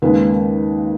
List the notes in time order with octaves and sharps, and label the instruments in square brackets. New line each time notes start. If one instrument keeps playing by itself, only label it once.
[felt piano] D#2 C#3 G#3 B4